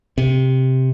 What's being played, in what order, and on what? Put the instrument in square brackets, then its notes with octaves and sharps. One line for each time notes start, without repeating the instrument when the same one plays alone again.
[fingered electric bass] C3